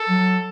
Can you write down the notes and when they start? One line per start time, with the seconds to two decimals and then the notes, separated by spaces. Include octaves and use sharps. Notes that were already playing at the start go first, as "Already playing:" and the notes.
Already playing: A4
0.09 F#3